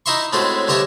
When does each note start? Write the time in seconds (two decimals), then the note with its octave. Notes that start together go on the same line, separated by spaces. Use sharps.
0.06 D#4 E4 D#5 E5 C6 C#6
0.33 A2 G#3 A3 C4 C#4 F#4
0.68 G2 D3 C#5 D#5 E5 A5